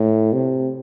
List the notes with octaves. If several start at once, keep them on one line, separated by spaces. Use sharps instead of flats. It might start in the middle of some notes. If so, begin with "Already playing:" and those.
Already playing: A2
C3